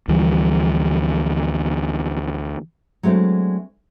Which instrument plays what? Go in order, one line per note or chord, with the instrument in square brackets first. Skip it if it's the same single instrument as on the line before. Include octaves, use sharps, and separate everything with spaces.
[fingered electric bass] D2 E3 F3 G3
[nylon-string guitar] F#3 G#3 A3 C4 D4